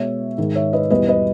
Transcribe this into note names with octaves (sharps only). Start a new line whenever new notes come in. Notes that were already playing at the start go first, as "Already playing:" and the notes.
Already playing: B2 G#3 C#5 E5
G#2 D#3 G#3
C#5 E5
B4 D#5
E2 B2 G3 B4 D#5
B4 D#5